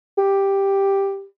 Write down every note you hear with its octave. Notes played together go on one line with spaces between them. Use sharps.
G4